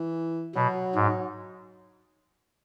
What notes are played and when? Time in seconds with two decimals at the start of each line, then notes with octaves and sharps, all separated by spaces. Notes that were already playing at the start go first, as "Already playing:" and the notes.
Already playing: E3
0.55 B2 F#3
0.95 G#2